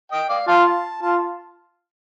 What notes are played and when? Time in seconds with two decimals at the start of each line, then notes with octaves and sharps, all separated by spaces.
0.12 D#5 G5
0.30 D5 F5
0.48 F4 F5 A5
1.02 F4 A5